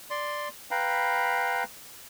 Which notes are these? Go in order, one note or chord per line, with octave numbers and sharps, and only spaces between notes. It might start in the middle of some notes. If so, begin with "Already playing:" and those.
D5 C6
B4 F5 G5 A#5 B5